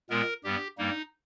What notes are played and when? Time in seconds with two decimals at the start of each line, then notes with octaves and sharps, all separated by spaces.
0.10 A#2 G#3 B3 A#4
0.44 G2 G3 B3 G4
0.78 G2 G3 A#3 D#4